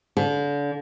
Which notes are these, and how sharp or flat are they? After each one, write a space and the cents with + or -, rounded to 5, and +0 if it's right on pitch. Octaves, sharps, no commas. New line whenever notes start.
D3 -35